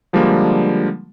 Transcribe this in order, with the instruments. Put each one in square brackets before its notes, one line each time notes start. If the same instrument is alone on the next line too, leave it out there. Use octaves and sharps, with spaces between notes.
[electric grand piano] D3 F3 G3 G#3 A#3 D4